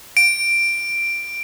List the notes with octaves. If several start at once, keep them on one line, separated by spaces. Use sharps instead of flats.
D7